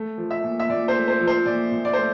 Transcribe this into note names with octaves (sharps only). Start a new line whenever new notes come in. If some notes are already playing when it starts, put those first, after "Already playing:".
Already playing: A3
F3
E5
A#2
E5
A#2 D5
C5
A3
C5
F3
C5
A#2 D5
A#2
D5
A3 C5